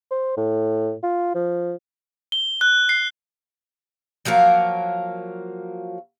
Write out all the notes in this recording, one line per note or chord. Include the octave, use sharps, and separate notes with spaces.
C5
A2
F4
F3
G7
F#6
C7
F3 F#3 A#3 A#4